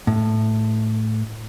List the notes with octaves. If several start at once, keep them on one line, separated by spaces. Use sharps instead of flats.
A2